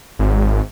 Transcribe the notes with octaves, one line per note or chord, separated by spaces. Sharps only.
G#1